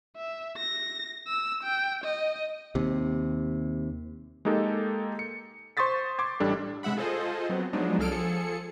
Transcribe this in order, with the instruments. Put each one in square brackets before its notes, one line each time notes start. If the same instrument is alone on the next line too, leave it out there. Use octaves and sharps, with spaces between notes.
[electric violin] E5
A#6
E6
G5
D#5
[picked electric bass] D#2 C3
[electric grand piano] G#3 A#3 D#4 G4 A4
C#7
C5 C6 C#6 D#6 A6 B6
C6 D6 G#6
A1 G3 D4 A4
[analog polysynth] C3 G#3 E5 F#5 B5
F4 G#4 A4 C5 D#5
F#3 B3 C4
F3 F#3 G#3 B3 D4 D#4
C2 F#3 G#4 A4 F6 D7
F3 G#4 A4 C#7